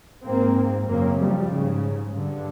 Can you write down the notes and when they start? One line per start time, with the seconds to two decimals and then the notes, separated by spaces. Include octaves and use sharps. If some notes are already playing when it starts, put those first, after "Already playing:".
0.23 G#2 A#3 C4
0.86 F#2 C#3 A#3 C4
1.19 F3 G3
1.50 G#2 C#3
2.13 G2 D3